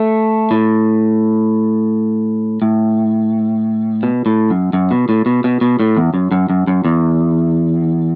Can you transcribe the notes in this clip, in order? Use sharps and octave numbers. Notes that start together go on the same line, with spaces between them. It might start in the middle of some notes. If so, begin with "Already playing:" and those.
Already playing: A3
A2
A2
B2
A2
F#2
F#2
B2
A2
B2
B2
B2
A2
E2
F#2
F#2
F#2
F#2
E2